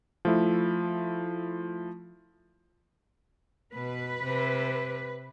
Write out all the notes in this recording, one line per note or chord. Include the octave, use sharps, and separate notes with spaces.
F3 A3 E4
B2 B4
C3